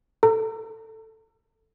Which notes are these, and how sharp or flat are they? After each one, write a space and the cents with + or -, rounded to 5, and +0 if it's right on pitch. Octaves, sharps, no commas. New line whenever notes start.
A4 +10 A#5 -30